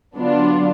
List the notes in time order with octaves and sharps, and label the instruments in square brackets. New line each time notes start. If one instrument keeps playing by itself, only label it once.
[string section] D3 F#3 B3 D4 F4